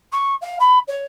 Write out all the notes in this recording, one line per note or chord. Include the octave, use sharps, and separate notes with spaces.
C#6
F5
B5
C#5